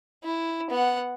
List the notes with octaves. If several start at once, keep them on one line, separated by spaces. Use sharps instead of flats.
E4
B3 F#5